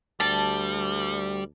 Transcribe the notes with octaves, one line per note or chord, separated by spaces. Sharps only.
D2 G3 A5